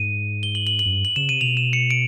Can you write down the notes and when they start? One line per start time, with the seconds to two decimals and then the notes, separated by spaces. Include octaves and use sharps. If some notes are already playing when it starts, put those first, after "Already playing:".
Already playing: G#2 D#7
0.43 G7
0.55 F#7
0.67 F#7
0.79 F#7
0.86 F#2
0.92 G2
1.05 F#7
1.16 C#3 E7
1.29 C3 D#7
1.41 B2 F7
1.57 E7
1.73 C#7
1.91 D7